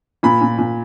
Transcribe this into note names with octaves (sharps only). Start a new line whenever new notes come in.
A#2 B5
A#2
A#2